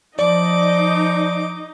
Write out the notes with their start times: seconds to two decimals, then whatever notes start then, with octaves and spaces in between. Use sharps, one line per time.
0.19 F3 D#4 D5 D#5 D6